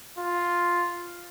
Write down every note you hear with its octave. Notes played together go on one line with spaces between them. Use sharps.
F4